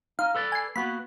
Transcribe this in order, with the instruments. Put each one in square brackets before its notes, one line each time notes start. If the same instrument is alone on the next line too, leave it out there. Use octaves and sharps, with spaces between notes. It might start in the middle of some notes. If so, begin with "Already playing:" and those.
[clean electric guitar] D#4 [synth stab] F5
[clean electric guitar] A4 B4 D5
[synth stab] G#5 C7
[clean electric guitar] A#3 B3 F#4 [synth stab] B5